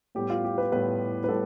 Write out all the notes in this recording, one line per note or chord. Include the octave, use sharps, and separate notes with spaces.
A2 G3 B3 G4
F4
G4
B4
A2 G3 B3 B4
B4
A2 G3 A4